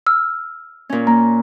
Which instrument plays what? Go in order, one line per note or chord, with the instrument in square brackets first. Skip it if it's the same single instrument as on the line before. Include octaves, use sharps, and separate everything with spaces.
[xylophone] E6 F6
[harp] A#2 C#4
[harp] A#3 [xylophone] A#5